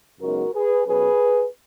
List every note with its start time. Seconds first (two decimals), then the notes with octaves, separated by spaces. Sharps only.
0.19 F#2 C#3 G#3 B3 D#4 F#4 A#4
0.53 G#4 B4
0.85 B2 F#3 C#4 G#4 B4